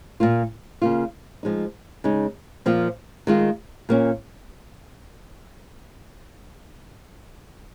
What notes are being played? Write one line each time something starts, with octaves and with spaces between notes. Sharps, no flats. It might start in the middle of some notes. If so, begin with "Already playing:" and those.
A#2 A#3 F4
C#3 A#3 F4
F3 G#3 D#4
C#3 G#3 D#4
A#2 F3 A#3 F4
D#3 G#3 F4
A#2 A#3 C#4